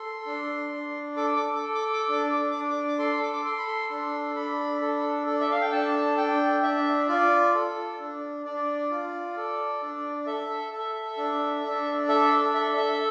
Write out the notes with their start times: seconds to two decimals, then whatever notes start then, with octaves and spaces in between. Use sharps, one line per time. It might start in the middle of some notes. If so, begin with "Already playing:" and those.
Already playing: A4 C6
0.26 D4
0.72 D4
1.17 A4 D6
1.36 D6
1.55 D6
1.63 A4
1.75 D6
1.93 D6
2.09 D4 D6
2.32 D6
2.51 D4 D6
2.70 D6
2.88 D6
2.99 A4 C6
3.22 D6
3.33 D6
3.45 A4 C6
3.59 B5
3.67 C6
3.90 D4 C6
4.35 D4 B5
4.82 A4
5.26 A4 D5
5.41 E5
5.51 F5
5.61 G5
5.72 D4 A5
6.17 D4 G5
6.63 D4 E5
7.08 F4 D5
7.55 A4
8.00 D4
8.45 D4 D5
8.91 F4
9.37 A4
9.82 D4
10.27 A4 E5
10.72 A4
11.17 D4
11.64 D4
12.08 A4 E5
12.54 A4 E5
12.78 E5